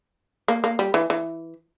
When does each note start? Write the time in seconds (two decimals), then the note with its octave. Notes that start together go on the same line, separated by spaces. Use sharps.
0.48 A#3
0.64 A#3
0.79 G3
0.94 E3
1.10 E3